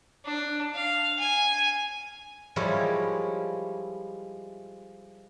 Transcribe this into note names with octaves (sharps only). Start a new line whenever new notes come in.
D4
F5
G#5
F3 G3 G#3 E4 A#4 C#5